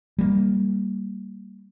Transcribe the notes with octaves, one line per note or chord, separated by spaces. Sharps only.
G3 A#3